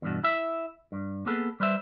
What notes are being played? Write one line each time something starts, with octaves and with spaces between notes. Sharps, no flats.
E2 G2 B2
E4 E5
G2
A#3 B3 G#4 A4 B4
G3 B4 C5 E5